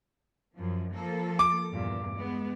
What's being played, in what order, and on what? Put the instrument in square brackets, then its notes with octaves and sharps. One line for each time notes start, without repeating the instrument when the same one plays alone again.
[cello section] F#2 F3
F3 A#3 A4
[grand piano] D6
[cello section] E2 G2 A#2
G#3 B3